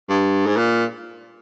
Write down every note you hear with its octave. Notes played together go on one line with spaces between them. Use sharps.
G2
G#2
A#2